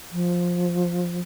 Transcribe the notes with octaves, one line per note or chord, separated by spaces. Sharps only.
F3